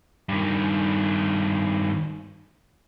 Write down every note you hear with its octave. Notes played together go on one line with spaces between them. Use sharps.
G2 D#3